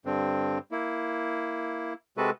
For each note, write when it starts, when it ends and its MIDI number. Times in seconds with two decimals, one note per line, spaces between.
0.05 0.58 43
0.05 0.58 50
0.05 0.58 60
0.71 1.93 58
0.71 1.93 64
2.17 2.30 48
2.17 2.30 56
2.17 2.30 66
2.17 2.30 69
2.17 2.30 71